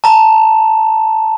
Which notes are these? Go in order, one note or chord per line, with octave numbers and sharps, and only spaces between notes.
A5 A#5